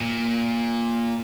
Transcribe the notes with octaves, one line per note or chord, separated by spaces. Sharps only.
A#2